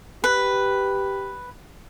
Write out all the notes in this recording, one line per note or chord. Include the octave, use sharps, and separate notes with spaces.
G4 B4